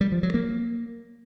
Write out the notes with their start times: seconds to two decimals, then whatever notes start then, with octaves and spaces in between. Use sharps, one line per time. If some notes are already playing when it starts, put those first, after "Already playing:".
0.01 G3
0.12 F3
0.23 F#3
0.34 A#3